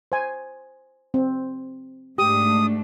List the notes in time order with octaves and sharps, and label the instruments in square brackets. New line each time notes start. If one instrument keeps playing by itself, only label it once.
[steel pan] C5 G#5
C4
[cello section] G#2 A3 D4 [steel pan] G4 [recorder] D#6